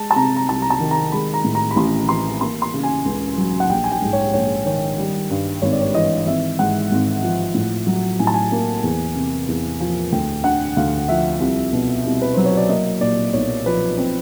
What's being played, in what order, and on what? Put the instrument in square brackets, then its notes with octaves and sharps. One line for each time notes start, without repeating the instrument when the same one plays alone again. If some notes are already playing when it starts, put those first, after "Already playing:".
Already playing: [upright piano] G#3 A5
A5
C3 A#5
A#5
C2 A5
A#5
A5
D#3
A#5
G#3 B5
A#5
A2
A#5
B5
A1 C6
E3 C6
A#3 C6
C6
C#3
G#5
C#2
F#3
F#5
A#1 G5
G#5
G5
G#2
C#5
A#1 C#5
D#3 C#5
G3
G2
G#1 C#5
D5
C#5
E3 D#5
G#1 E5
G#2 F#5
G#1
F3
A2
F#3
A2 G#5
A5
G#5
A#3
E2
C3
E2
F3
D2 G5
D3 F#5
D2 F5
F3 E5
C2
B2
C2
B4
F#3 C5
C#5
D5
A#3 D#5
A#2 D5
B1 C#5
F3 B4
C4